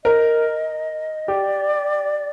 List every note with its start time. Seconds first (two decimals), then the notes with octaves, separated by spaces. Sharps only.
0.04 A#4 D#5
1.28 G4 D5